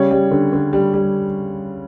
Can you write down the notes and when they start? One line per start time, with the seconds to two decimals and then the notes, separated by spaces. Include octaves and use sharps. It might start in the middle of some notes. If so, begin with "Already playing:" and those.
Already playing: C#3 G3 C#5
0.11 G3
0.31 D3
0.53 D3
0.73 G3
0.94 G3